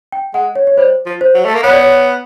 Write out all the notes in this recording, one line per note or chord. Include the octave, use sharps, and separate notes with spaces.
G5
G#3 F#5
C#5
C#5
G3 C5
F3
C5
F#3
A3
A#3
B3 C#5
D5
C#5